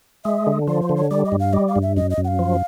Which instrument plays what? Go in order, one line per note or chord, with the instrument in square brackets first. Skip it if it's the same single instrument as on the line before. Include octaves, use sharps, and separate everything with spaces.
[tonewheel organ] G#3 [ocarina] E5
[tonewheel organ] D3
[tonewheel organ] F3 [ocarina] D5
[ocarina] C5
[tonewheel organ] D3
[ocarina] C#5
[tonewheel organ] G3 [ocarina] D5
[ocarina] D#5
[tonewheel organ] G2
[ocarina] F5
[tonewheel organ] G3 [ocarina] D#5
[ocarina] F5
[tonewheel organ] G2
[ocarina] E5
[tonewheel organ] F#2 [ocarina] D#5
[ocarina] D#5
[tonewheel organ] F#2
[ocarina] F#5
F5
[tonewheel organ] F3